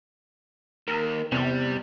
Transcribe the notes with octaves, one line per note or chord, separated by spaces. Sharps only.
D#2 A#4
E2 C3 G3